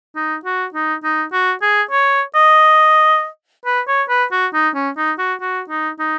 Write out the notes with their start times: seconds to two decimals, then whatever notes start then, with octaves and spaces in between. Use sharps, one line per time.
0.16 D#4
0.45 F#4
0.74 D#4
1.04 D#4
1.33 F#4
1.62 G#4
1.91 C#5
2.35 D#5
3.66 B4
3.88 C#5
4.09 B4
4.32 F#4
4.54 D#4
4.75 C#4
4.97 D#4
5.19 F#4
5.41 F#4
5.69 D#4
5.99 D#4